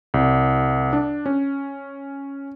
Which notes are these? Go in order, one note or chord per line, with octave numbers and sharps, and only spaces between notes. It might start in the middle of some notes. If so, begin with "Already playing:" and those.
C2
D4
C#4